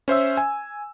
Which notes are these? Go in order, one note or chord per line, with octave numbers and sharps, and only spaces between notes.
C#4 C5 E5 E6
G#5